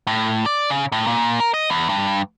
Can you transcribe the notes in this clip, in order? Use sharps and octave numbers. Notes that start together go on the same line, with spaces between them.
A2
D5
C#3
A2
A#2
A#4
D#5
E2
G2